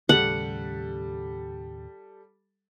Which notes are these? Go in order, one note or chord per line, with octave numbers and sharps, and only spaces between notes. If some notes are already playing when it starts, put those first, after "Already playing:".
D#2 A2 C#3 G3 A4 F#5